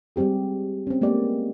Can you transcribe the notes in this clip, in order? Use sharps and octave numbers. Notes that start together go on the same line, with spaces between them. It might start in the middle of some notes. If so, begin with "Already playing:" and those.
G3 G#3 C4 G4 G#4
C4 C#4
G#3 A#3 B3 G4 D5